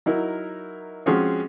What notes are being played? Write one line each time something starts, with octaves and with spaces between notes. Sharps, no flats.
F#3 D#4 E4 A#4
F3 G#3 C4 C#4 F#4 G#4